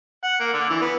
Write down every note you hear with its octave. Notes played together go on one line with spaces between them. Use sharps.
F#5
A#3
D3
E3
B3